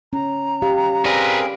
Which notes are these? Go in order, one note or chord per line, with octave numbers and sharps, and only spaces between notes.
C#4 A#5
G4 F5
C4 G#4 A#4 B4 D5 F5